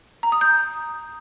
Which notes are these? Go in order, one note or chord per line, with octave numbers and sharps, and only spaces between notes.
A#5
D#6
G6